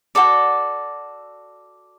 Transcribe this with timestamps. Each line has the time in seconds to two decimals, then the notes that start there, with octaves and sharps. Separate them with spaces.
0.15 F#4 A4 D5